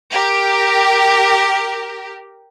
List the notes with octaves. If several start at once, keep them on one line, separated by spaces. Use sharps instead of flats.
G4 A#4